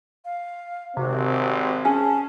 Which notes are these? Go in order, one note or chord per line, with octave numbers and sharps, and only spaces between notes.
F5
G#1 C3 C4 F#4
C#4 G#4 A5